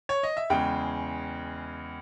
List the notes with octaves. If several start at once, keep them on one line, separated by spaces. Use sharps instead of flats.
C#5
D#5
E5
E2 C#3 G#3 G5